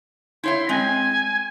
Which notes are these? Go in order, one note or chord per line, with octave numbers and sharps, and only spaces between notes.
E4 C#5 E5 C6
G#3 C4 G#5